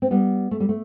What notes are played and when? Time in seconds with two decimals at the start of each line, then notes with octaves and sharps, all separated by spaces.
0.02 C4
0.11 G3 B3
0.51 A3
0.60 G3
0.69 A3